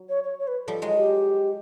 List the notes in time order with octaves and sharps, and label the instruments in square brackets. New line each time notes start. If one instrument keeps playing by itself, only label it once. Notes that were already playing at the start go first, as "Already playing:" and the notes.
Already playing: [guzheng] F#3
[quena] C#5
C#5
C#5
B4
[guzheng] F3 G3 [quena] A4
[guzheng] F#3 G#3
[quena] G4